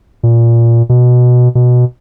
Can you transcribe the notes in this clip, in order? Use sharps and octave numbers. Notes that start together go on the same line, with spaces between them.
A#2
B2
B2